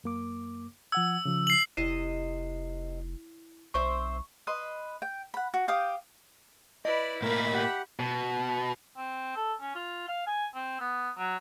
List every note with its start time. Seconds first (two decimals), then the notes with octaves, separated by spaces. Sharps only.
0.04 F#2 A#3 D6
0.92 F3 F#5 E6 G#6
1.25 C#3 F3
1.47 C7 F#7
1.77 F1 C3 E4 D#5 C7 E7
3.74 B1 C4 C5 E5 C#6
4.47 B4 D#5 C6
5.02 G5
5.34 F#5 B5
5.54 F#4
5.68 G4 F5 G5 D#6
6.85 E4 B4 D5 D#5
7.22 A2 A#3 A#4 E5 B5
7.53 G4 F#5
7.99 B2
8.97 C4
9.36 A4
9.61 C#4
9.75 F4
10.09 F5
10.27 G#5
10.54 C4
10.80 B3
11.18 F#3